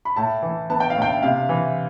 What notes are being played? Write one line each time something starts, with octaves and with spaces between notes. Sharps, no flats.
B5
A2 A5
E3
B3 A5
G5
F5
A2
G5
C3 F5
E3